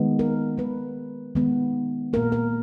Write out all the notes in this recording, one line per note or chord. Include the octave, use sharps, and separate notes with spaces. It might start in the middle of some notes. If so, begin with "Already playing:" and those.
Already playing: D#3 G#3 B3
A#4
D#3 G#3 B3 B4
D#3 G#3 B3
A#2 A#3 A#4
A#4